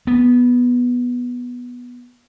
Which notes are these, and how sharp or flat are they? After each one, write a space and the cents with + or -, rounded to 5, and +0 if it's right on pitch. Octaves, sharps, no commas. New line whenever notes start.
B3 -10